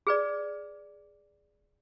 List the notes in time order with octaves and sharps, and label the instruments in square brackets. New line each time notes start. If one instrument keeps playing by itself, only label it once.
[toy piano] G#4 B4 D5